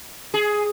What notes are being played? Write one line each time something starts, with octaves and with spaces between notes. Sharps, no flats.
G#4